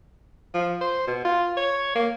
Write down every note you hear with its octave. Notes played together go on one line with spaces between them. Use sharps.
F3
C5
B2
F4
C#5
A#3